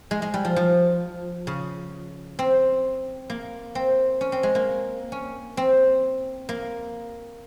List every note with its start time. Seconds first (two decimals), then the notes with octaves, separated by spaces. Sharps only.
0.11 G#3
0.22 G#3
0.34 G3
0.45 F3
0.56 F3
1.47 C#3
2.39 C4
3.30 A#3
3.75 C4
4.21 C#4
4.32 C4
4.43 G#3
4.55 A#3
5.12 C#4
5.57 C4
6.49 A#3